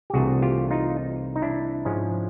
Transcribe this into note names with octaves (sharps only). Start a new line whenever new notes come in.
G4
C2 C3 E3 A3 D4 F#4 G#4
F4 G4
D#4 F4
D#4
D4 E4
G#2 F3 G#3 C#4